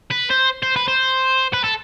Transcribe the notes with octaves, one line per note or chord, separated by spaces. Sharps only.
B4
C5
C5
B4
C5
B4
A4